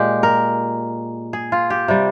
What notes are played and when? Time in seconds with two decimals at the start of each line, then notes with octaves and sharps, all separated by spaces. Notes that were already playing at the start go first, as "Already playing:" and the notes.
Already playing: A#2 G#3 G4
0.23 A#4
1.33 G#4
1.52 F4
1.70 G4
1.88 C3 G3